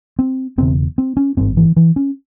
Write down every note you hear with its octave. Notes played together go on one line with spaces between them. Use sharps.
C4
E1 E2 C#3 C4
C4
C#4
G#1 G2 C4
E3
E3
C#4